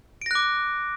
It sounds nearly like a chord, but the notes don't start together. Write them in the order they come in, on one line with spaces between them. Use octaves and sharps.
D7 A#6 F#6 D6